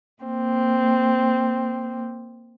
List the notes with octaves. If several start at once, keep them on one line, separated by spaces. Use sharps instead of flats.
A#3 C4